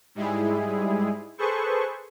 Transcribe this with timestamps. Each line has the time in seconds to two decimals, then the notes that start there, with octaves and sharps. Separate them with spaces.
0.15 G#2 G3 G#3 E4 G#4
1.38 G#4 A4 B4 C5 C#6